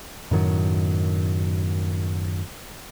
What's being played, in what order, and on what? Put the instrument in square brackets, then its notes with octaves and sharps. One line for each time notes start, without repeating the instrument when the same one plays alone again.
[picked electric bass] F#2 A2 D#3 F#3